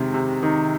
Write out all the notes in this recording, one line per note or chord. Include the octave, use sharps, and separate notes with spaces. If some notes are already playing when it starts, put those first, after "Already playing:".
Already playing: C3 D#3 G#3
C3
D#3